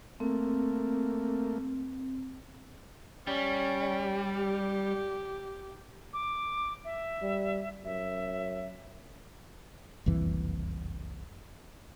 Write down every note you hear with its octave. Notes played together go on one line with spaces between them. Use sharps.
A3 A#3 C4
G3 C#4
G4
D6
E5
G3
F#2 E5
F#1 C2 F2 E3